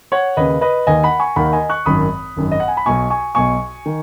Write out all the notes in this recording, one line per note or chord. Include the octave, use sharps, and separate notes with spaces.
C#5 F#5
D#2 C#3 B4 D#5
B4 D#5
D#2 D#3 D#5 G#5
F#5 B5
G#5 C#6
D#2 D#3 F#5 B5
D#5 G#5
C#6 F#6
G#1 F#2 D#3 B5 D#6
G#1 F#2 D#3
D#5
F#5
G#5
B5
B1 B2 G#5 C#6
G#5 C#6
B1 B2 G#5 C#6
D#3